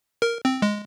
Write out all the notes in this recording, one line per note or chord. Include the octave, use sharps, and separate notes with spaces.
A#4
C4
G#3